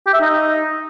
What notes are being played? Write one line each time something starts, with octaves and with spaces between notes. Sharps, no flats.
G4
E5
D#4